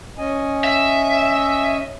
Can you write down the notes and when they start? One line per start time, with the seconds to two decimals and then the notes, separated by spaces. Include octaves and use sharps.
0.18 C#4 D#5 G#5
0.64 E5